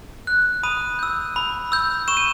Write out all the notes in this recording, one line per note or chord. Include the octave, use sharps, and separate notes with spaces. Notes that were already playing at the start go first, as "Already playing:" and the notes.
F#6
B5 D#6 D#7
E6 G6
B5
E6 G6
C#6 E7
D#7